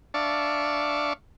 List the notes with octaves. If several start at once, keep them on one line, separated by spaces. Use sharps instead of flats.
D4 D5 E5 F5 A5 C#6